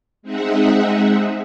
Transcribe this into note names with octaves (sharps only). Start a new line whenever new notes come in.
G#3 C4 D#4 G#4 E5 F#5